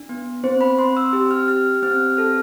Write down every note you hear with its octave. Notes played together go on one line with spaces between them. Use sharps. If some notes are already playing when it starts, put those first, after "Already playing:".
Already playing: D4
B3
C4 C5
B5
C4 C6
E6
G4
F6
G4 F6
C4 F6
A4 F6